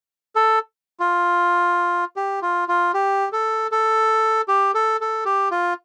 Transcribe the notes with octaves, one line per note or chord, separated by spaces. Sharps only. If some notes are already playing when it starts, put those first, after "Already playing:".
A4
F4
G4
F4
F4
G4
A4
A4
G4
A4
A4
G4
F4